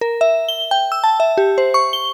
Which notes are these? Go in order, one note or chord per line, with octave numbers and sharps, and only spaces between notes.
A#4
E5
G7
G5
E6
A5
E5
G4
C5
C#6
G7